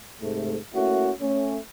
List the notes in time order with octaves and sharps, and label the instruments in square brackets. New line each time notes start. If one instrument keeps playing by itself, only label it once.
[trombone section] G#2 C3 A3
A3 A#3 C#4 E4 F#4
A3 C#4